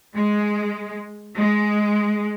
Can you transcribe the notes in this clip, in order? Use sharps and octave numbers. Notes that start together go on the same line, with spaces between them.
G#3
G#3